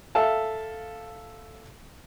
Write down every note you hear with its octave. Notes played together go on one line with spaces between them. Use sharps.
A4 E5 F5 A5